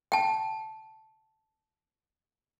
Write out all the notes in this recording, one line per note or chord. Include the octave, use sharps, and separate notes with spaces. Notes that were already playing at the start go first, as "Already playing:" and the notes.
G5 A5